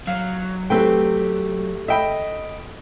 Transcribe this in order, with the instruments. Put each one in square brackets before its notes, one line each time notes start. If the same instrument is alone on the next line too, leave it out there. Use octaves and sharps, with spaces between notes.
[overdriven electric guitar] F#3 [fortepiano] F5
[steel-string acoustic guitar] A3 G4 [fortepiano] C4 B4 G5
[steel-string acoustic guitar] D#5 [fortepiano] E5 G5 B5